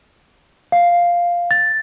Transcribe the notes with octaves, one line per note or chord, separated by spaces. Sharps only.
F5
A6